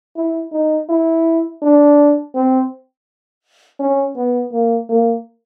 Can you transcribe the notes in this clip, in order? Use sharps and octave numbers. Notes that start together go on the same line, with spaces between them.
E4
D#4
E4
D4
C4
C#4
B3
A#3
A#3